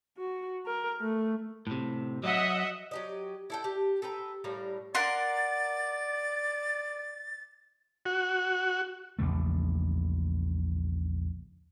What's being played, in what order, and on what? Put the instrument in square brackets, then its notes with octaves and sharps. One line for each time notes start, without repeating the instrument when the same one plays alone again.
[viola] F#4
A#4
A3
[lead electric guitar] A2 C3
[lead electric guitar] F#3 [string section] D#5 E5 F#5
[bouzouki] F#3 G4 D#5
E4 A4 G5
G4
A4 B4 G5 A#5
A2 G3 A#4 F5
[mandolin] A#4 F#5 C6 [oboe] D5 [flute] A6
[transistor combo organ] F#4
[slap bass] A#1 E2 C#3 A3